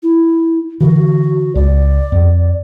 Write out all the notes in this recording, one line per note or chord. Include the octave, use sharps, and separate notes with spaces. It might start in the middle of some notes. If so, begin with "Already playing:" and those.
E4
D3 E3 F#4
C#2 D5
F2